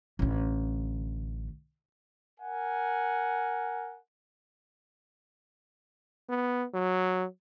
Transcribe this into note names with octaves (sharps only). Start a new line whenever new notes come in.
A1 D3
A#4 F#5 G#5
B3
F#3